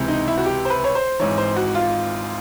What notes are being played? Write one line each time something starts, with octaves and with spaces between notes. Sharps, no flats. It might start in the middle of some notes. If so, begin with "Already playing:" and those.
Already playing: C#2 C3 E3
D#4
E4
F#4
G4
C5
B4
C#5
C5
G#1 G#2 E3 C#5
C5
F#4
F4